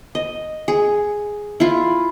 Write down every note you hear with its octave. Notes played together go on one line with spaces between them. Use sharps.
D#5
G#4
E4 F4